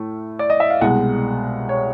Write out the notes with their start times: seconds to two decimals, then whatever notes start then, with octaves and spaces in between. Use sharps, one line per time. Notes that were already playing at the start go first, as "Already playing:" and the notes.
Already playing: A2 A3
0.39 D5
0.50 D#5
0.60 E5
0.70 F5
0.81 C2 B2 G#3 F#5
1.69 C#5